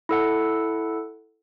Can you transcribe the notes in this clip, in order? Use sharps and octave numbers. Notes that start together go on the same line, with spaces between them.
E4 A4 F#5